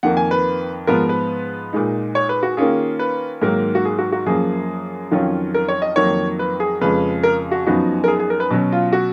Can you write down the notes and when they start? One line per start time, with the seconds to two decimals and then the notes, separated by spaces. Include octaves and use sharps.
0.03 F2 D#3 A#3 F#5
0.17 G#5
0.31 B4
0.87 G#2 F3 B3 F4 A#4
1.09 B4
1.73 A#2 G#3 D#4
2.15 C#5
2.29 B4
2.43 F#4
2.57 D#3 A#3 C#4 F4 G#4
2.99 B4
3.42 G#2 D#3 F#3 A#3 A#4
3.75 F#4
3.85 G#4
3.98 F#4
4.12 F#4
4.26 F#2 F3 A#3 G#4
5.11 F2 D#3 F#3 C#4 F4
5.54 A#4
5.68 C#5
5.82 D#5
5.96 F2 D#3 F#3 A#3 C#5
6.39 B4
6.60 G#4
6.81 F2 C#3 G#3 B4
7.23 A#4
7.51 F#4
7.66 F#2 F3 B3 D#4 F#4
8.04 A#4
8.08 G#4
8.20 G#4
8.30 A#4
8.40 B4
8.50 B2 F#3 C#4
8.72 F4
8.93 F#4